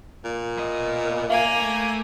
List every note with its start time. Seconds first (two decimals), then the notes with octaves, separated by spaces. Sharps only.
0.24 A#2
0.58 B2 D#5
1.29 A#3 E5 F5 G#5
1.59 A3 A4